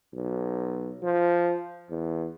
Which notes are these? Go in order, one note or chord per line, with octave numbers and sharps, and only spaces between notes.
B1
F3
E2